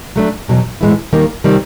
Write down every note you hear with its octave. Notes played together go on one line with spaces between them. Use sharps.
F#3 A3 D4
E2 B2 F#3
A2 E3 G#3 B3 E4
D#2 D#3 G3 A#3
C3 D#3 G3 C4